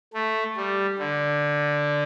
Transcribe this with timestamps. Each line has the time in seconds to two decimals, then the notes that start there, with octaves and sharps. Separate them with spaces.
0.14 A3
0.56 G3
0.98 D3